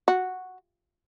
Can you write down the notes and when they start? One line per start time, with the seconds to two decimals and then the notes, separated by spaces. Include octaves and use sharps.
0.08 F#4